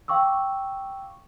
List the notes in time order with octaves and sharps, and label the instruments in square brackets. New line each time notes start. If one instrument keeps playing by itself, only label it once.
[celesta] F5 G5 C#6 D6 E6